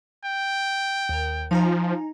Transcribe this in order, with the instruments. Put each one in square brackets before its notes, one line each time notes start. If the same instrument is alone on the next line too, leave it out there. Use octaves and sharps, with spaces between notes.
[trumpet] G5
[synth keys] D#2 A#4
[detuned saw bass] F3 [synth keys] D#4 G#5 A#5